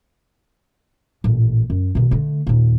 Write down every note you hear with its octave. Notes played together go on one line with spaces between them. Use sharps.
A1 A#2
F#2
B2 D#3
D3 A3
D#2 A#2